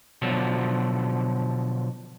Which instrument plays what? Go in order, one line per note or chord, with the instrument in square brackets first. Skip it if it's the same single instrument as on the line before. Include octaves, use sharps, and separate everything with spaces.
[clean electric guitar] B2 D3 F3 F#3